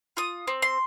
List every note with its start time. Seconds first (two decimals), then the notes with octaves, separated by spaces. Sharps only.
0.17 F4 D#6
0.47 C4
0.62 C6